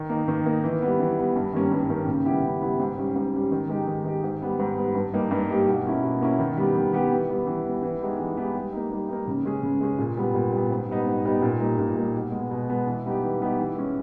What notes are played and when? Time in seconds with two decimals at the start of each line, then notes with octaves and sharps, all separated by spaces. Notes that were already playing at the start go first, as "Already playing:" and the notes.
Already playing: D#3
0.09 A#3 D#4
0.28 D#3
0.46 A#3 D#4
0.64 E3
0.82 G3 B3
1.00 E3
1.18 G3 B3
1.36 G2
1.53 D#3 G3 A#3 C#4
1.72 G2
1.89 D#3 G3 A#3 C#4
2.08 C#3
2.25 G3 B3 E4 G4
2.44 C#3
2.62 G3 B3 E4 G4
2.79 G#2
2.98 G3 C#4
3.16 G#2
3.34 G3 C#4
3.51 D#3
3.69 G#3 D#4 G4
3.87 D#3
4.05 G#3 D#4 G4
4.24 G#2
4.42 G3 B3
4.59 G#2
4.77 G3 B3
4.95 G2
5.14 G3 A#3 D#4 G4
5.31 G2
5.50 G3 A#3 D#4 G4
5.68 B2
5.86 A#3 C#4 E4
6.03 B2
6.21 A#3 C#4 E4
6.39 D#3
6.57 G3 B3 G4
6.75 D#3
6.93 G3 B3 G4
7.12 E3
7.29 G3 B3
7.47 E3
7.65 G3 B3
7.83 E3
8.01 G#3 B3 D#4 G4
8.20 E3
8.37 G#3 B3 D#4 G4
8.55 G3
8.73 A#3 D#4
8.92 G3
9.09 A#3 D#4
9.27 C#3
9.45 G#3 C#4 G#4
9.63 C#3
9.81 G#3 C#4 G#4
9.98 A#2
10.17 G3 B3
10.34 A#2
10.53 G3 B3
10.71 G#2
10.89 G3 B3 D#4
11.07 G#2
11.25 G3 B3 D#4
11.42 A#2
11.60 G3 A#3 D#4
11.79 A#2
11.97 G3 A#3 D#4
12.15 B2
12.32 G#3 B3
12.51 B2
12.69 G#3 B3
12.87 E3
13.05 G3 B3 D#4 G4
13.23 E3
13.40 G3 B3 D#4 G4
13.59 E3
13.77 G#3 C#4